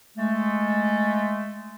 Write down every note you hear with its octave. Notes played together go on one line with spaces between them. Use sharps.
G#3 A3